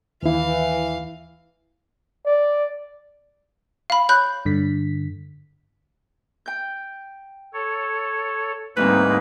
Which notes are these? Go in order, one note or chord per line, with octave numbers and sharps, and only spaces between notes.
D#2 E3 E4 F5
D5
F5 B5
C#5 B5 F#6 G6
G2 D3 B6
G5 G6
A4 C#5
D2 G#2 G3 A#3 C4 D#4 B4